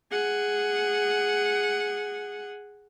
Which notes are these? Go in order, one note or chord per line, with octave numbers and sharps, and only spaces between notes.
G#4 F#5